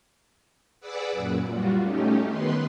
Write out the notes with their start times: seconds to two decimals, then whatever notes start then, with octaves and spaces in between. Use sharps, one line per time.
0.81 G#4 B4 D5 F#5 D6 E6
1.12 F#2 A#2
1.50 G3 F4 F#4
1.80 A3 C#4 D#4 G4
2.27 D#3 B3 B4 C6